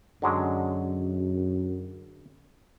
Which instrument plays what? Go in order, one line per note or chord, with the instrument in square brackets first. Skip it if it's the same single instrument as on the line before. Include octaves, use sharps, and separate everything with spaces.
[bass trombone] F#2 [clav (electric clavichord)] D3 F#3 G#3